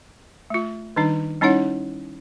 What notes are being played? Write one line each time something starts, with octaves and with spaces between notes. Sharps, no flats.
A3 F4
D#3 G3 D4 D#4
G3 C#4 D#4 E4 C#5 F#5